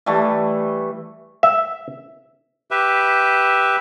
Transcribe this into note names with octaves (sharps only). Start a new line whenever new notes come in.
E3 G3 A3
E5
G4 B4 E5